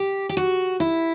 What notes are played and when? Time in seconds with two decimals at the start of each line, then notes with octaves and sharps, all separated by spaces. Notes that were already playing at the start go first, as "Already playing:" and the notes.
Already playing: G4
0.29 G4
0.37 F#4
0.80 E4